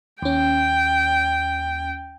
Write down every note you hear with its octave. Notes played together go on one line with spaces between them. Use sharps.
D#2 C#4 G5